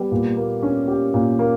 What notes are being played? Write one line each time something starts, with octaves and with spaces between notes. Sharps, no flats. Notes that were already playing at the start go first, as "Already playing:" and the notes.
Already playing: G3 B3
A#2
A#3
C#4
G4
A#2
A#3